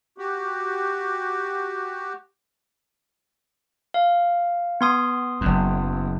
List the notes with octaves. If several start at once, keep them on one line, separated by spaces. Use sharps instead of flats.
F#4 G4
F5
B3 C6 D#6
F#1 F#2